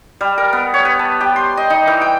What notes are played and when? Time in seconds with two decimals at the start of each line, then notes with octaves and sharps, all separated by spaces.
0.21 G3
0.38 A#4
0.53 B3
0.74 C#5
0.85 B4
0.99 A5
1.21 G4
1.36 C6
1.57 D#5
1.70 D#4
1.87 E3
2.01 G5